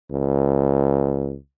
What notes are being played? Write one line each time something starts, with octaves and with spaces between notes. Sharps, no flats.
C#2